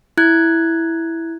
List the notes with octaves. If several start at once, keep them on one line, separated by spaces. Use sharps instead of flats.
E4 F#6 G#6